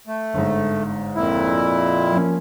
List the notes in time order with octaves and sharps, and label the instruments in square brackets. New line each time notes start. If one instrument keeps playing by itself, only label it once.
[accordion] A3
[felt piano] G1 G#2
[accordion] F2 A#2 E4
[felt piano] F3 A#3 C#4